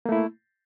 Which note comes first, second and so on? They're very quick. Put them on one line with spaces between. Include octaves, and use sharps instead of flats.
A#3 A3 E4